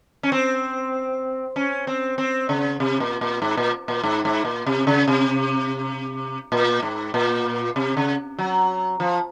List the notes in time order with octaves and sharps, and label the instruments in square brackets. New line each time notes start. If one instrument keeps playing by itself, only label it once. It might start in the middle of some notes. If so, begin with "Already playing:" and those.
[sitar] C#4
C4
C#4
C4
C4
C#3
C3
A#2
A#2
G#2
A#2
A#2
G#2
G#2
A#2
C3
C#3
C3
A#2
G#2
A#2
C3
C#3
F#3
F3